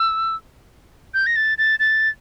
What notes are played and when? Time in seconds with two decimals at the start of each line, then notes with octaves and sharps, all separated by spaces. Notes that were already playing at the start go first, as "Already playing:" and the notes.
Already playing: E6
1.14 G6
1.26 A#6
1.36 A6
1.58 A6
1.79 A6